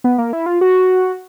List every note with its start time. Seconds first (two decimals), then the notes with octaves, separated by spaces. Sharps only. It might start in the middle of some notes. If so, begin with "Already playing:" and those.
0.04 B3
0.18 A#3
0.33 E4
0.46 F4
0.61 F#4